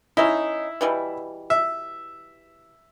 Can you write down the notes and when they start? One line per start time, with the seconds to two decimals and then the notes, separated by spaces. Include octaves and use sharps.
0.17 C#4 D#4 E4
0.81 B2 E3 G3
1.50 E5